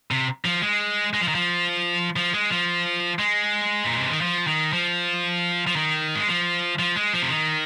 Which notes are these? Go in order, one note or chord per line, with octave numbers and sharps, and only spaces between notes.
C3
F3
G#3
G#3
F3
D#3
F3
F3
G#3
F3
G#3
A#2
C3
D#3
F3
D#3
F3
F3
D#3
G#3
F3
F3
G#3
F3
C3
D#3